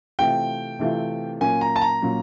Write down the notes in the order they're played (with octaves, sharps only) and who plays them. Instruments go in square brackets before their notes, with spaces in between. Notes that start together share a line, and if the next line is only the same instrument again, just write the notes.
[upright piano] C3 E3 A3 C4 F4 [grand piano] G5
[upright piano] C3 E3 A3 C4 F4
[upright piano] A#2 F#3 A#3 C#4 [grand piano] G#5
[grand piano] A#5
A5
A#5
[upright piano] A#2 F#3 A#3 C#4